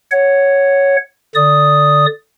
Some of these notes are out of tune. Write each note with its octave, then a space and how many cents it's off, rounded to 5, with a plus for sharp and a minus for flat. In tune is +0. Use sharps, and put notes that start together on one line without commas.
C#5 +0 F#5 +0
D3 +0 D5 -5 D#6 +0